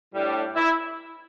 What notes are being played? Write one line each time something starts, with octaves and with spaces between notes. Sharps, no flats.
A2 G3 D4
E4